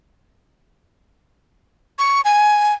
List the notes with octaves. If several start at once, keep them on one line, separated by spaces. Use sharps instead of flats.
C#6
G#5